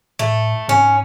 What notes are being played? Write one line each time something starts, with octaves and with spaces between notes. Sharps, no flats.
A2 A3
G#2 C#4